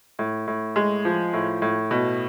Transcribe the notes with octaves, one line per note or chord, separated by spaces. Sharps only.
A2
A2
G#3
F3
A2
A2
B2